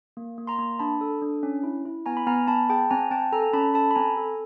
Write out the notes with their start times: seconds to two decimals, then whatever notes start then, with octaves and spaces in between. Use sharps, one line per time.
0.17 A#3
0.38 A#3
0.47 A#5 C6
0.59 A#3
0.79 D4 A5 B5
1.01 A4
1.22 D4
1.43 C#4
1.63 E4
1.86 E4
2.06 B3 G#5 A#5
2.17 B5
2.27 B3 G#5 A#5
2.48 B3 A5 B5
2.69 G#4 G5 A5
2.90 C4 G#5 A#5
3.11 C4 G5 A5
3.32 A4 G#5 A#5
3.53 C#4 A5 B5
3.74 A4 A5 B5
3.91 B5
3.96 C4 G#5 A#5
4.17 A4